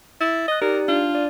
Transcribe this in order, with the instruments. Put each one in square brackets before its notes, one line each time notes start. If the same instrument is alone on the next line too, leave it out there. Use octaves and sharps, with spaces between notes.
[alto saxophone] E4 [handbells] A6
[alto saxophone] D#5 [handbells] D#6 F#6
[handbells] D#4 G4 D5 [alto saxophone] A#4
[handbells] D4 [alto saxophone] F4
[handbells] D5